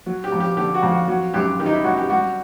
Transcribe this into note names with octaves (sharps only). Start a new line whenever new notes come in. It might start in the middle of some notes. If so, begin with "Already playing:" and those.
F#3
G4
F2
G4
D3 G4
F#4
F2
F#4
F#3 F#4
F#2 G4
D#3 G4
D#4
E4
F#2 F#4
G4
G3 F#4